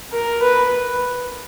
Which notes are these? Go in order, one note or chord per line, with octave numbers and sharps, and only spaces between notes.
A#4
B4